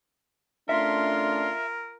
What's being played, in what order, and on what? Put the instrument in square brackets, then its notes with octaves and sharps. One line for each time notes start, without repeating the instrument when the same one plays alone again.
[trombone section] A3 C#4 D4 [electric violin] F4 C6 [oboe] A#4 [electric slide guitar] E5